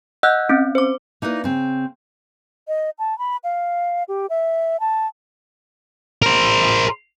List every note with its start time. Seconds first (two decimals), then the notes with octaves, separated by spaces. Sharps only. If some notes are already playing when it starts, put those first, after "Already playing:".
0.23 D#5 F#5 E6 F#6 G6
0.49 C4 C#4
0.75 C5 D6
1.22 A#3 D#4 E4 B4 D5
1.44 C#3 C4
2.68 D#5
2.99 A5
3.19 B5
3.44 F5
4.08 G4
4.30 E5
4.80 A5
6.22 A#4 C5